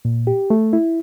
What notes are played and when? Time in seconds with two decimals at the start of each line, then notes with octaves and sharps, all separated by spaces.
0.05 A#2
0.27 G4
0.50 A3
0.73 E4